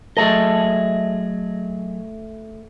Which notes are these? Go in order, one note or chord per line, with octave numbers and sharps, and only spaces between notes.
F#3 A3 G#4 A4 D#5